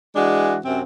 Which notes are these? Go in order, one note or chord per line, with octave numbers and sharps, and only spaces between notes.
E3 G#3 D4 F#4
F#2 C3 C4